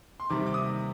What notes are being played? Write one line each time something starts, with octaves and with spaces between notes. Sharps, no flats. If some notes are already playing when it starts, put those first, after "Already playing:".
C6
C3 D#3 G3 D6
D6
D#6